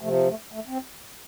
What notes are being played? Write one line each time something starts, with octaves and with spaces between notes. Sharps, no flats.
C3 F3 A3
A3
A3
C4